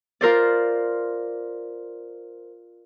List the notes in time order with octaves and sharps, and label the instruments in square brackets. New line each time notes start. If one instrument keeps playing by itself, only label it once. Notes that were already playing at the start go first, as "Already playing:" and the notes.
[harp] F4 A#4 C5 D5